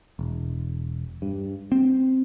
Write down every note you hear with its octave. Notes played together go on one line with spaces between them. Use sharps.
E1
G2
C4